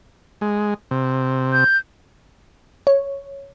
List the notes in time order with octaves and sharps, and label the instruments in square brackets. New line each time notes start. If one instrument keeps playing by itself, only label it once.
[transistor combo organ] G#3
C3
[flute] G6
[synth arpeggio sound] C#5